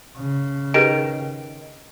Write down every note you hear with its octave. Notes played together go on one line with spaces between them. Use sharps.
C#3
D#3 G4 G#4 B4 D7